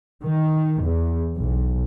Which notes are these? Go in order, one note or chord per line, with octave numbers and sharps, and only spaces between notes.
D#3
E2
B1